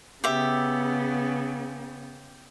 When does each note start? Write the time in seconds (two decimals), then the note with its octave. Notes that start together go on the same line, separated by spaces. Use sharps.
0.24 C#3 B3 G4 E5